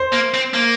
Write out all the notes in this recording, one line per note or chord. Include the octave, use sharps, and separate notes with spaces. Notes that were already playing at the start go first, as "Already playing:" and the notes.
Already playing: C5
A#3
C4
A#3